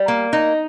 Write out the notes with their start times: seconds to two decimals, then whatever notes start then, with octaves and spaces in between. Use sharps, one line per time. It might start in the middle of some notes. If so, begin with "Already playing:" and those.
Already playing: G3
0.08 A#3
0.33 D#4